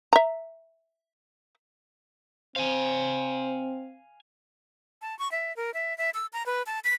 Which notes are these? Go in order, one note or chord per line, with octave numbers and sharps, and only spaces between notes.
E5 A#5
C4 C5 F5 G#5
A5
C#6
E5
A#4
E5
E5
E6
A#5
B4
A5
B6